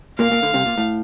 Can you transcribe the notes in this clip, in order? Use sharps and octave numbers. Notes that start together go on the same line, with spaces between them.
A#2 A#3 F5
A#2 A#3
D2 D3
C2 C3
A#2
A2